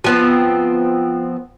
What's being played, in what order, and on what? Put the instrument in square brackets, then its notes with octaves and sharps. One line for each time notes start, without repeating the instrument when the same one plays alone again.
[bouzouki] F3 B3 C4